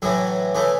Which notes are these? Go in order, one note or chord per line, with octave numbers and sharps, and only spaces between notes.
A2 E3 F#3
C#3 E3 A3